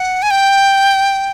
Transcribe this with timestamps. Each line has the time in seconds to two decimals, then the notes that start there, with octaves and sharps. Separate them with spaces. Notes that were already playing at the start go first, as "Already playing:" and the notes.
Already playing: F#5
0.22 G#5
0.31 G5